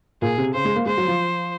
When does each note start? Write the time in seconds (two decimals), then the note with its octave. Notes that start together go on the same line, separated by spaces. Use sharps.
0.22 A#2 G#4
0.38 C3
0.54 C#3 C5
0.65 G#3
0.75 A#3
0.86 G#3 C5
0.97 F#3
1.07 F3